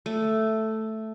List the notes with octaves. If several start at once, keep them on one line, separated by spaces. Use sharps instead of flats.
A3